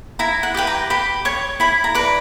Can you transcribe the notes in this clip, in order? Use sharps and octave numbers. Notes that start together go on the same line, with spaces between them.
E4 A#5
F#5
G4 B4 G5
A#5
G4 B5
C#5 C#6
E4 B5
A#5
B4 D5